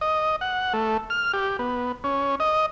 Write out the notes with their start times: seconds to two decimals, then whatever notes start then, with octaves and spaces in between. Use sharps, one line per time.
0.01 D#5
0.41 F#5
0.73 A3
1.10 F6
1.33 G4
1.59 B3
2.04 C#4
2.40 D#5